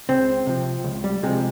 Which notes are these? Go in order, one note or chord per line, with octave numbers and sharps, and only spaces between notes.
C#2 C4
C3 F3
C#2
G3
C3 F3 G#3